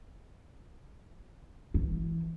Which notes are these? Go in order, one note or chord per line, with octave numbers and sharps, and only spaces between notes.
E3